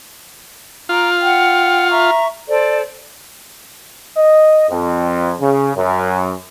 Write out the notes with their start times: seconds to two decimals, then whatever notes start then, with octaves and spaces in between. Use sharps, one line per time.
0.89 F4 A#5 D6
1.21 F#5 G5
1.90 E5 A#5 C#6
2.48 A4 C5 D5
4.17 D#5
4.70 F2
5.40 C#3
5.77 F#2